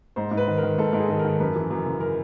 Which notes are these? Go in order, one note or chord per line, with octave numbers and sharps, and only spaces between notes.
G#2 C5
G#2
B4
D#3
A#4
D#3
G#2 A4
G#2
G#4
D#3 A4
A#4
D#3
F#2 B4
E3
F#2
C#3
A#4